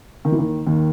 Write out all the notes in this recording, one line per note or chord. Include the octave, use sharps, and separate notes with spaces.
D#3
E3
D#2 D#3
D#2 D#3